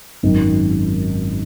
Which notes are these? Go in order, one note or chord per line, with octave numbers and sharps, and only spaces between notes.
G#1 F#2 D#3